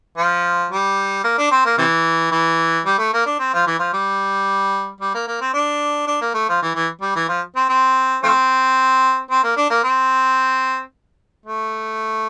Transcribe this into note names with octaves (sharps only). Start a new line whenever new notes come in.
F3
G3
A#3
D4
C4
A#3
C3 E3
E3
G3
A3
A#3
D4
C4
F3
E3
F3
G3
G3
A#3
A#3
C4
D4
D4
A#3
A3
F3
E3
E3
G3
E3
F3
C4
C4
F3 A3 C4
C4
A#3
D4
A#3
C4
A3